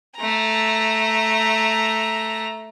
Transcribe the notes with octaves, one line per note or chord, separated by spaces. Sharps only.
A3 A#5